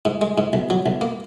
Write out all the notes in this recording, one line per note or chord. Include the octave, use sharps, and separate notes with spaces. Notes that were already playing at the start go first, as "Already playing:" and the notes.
G#2
G#3
G#2
B1
F#3
B1
A#3